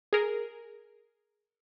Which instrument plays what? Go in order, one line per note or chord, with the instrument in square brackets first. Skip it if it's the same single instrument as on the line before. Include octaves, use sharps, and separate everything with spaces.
[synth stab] G#4 A#4